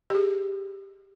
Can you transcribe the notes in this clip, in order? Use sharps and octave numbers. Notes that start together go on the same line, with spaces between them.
G4 G#4